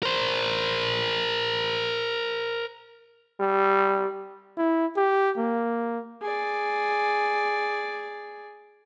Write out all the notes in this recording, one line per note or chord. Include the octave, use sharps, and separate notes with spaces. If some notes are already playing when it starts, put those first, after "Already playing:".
A#4 C5
G3
E4
G4
A#3
G#4 D5